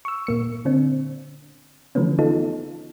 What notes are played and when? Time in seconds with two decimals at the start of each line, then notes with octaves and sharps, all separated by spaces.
0.05 C#6 E6
0.27 A#2 A#3 C#7
0.65 D3 C4 D4
1.95 D3 E3 F3 A3 B3 C#4
2.19 B3 D#4 F4 A4